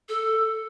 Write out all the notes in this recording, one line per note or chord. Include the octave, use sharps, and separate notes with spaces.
A4